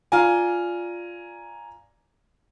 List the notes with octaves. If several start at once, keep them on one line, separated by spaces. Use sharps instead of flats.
F4 D5 G#5 A#5